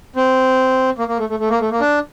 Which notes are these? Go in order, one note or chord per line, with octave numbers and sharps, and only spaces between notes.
C4
A#3
A#3
A3
A3
A3
A#3
A3
A#3
D4